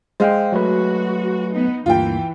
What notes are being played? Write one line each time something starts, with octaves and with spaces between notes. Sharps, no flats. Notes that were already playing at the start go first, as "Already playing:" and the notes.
G#3 C5 F5 G5
F#3 A3 F#4 B4
B3 D#4
D2 G2 E3 A#3 F4 G5